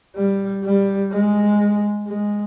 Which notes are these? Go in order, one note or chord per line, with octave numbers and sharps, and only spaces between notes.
G3
G3
G#3
G#3